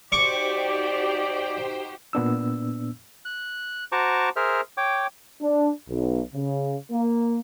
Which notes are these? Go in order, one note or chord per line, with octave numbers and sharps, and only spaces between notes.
D#4 F#4 G4 C5 D5 G5 C#6 D6
A#2 B3 D4 E6
F#6
F#4 C5 A5 A#5 C#6 D6
G#4 A#4 C5 E5 F6
C#5 G5 D6
D4
B1
C#3
A#3